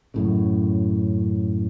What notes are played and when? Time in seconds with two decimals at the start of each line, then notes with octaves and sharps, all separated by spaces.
0.14 F#2 A2 C#3